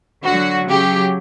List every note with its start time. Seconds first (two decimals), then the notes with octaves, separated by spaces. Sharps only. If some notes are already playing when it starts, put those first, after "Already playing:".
0.24 D3 F#3 F#4
0.66 C#3 F#3 G4